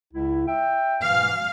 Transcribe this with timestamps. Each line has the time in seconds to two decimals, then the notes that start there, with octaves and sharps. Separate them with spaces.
0.13 C#2 C#3 E4
0.47 E5 G5
1.02 G#2 B2 E3 F5